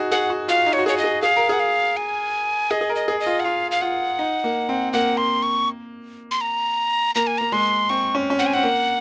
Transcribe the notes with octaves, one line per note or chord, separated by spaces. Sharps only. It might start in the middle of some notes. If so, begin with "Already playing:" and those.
Already playing: D#4 F#4 G#4
G#4 F#5
F#4
F4 F5
D#4
C#5
F#4
G#4 C#5
D#5
G#4
G#4 F5
A#4
G#4 F#5
F5
G#5
G#4 D#5
G#4
A#4
D#5
G#4
D#5
F4
F#5
F4 F5
F5
F4 F#5
D#4
A#3
C4
A#3 F#5
C6
C#6
C6
A#5
A#3 A#5
G#5
A#3 A#5
G#3 C6
C4 C#6
C#4
C#4
C4 F#5
G#5
C4 F#5
A#3